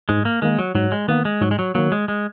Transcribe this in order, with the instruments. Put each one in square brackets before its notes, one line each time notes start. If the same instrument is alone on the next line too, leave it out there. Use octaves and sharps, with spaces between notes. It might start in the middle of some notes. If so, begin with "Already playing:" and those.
[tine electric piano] G#2 [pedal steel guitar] G#3
[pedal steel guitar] A#3
[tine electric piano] D#3 A#3 [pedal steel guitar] G#3
[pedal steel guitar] F#3
[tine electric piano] G#2 [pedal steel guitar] F#3
[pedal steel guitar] G#3
[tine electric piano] D#3 A#3 [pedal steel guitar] B3
[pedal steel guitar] G#3
[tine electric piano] G#2 [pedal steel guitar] F#3
[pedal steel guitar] G#3
F#3
[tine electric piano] D#3 A#3 [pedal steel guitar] F#3
[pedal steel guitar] G#3
G#3